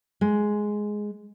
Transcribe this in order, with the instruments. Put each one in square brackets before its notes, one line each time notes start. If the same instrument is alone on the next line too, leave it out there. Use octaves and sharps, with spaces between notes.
[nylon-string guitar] G#3